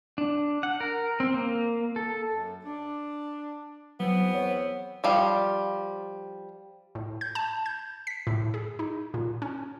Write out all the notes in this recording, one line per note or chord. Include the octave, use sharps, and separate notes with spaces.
D4
F#5
A#4
C4
A#3
A4
F#2
D4
E2 F#3 B3 C4
C#5
F3 G3 F5
A2
G6
A5
G6
B6
A2
G#4
D#4
A#2
C#4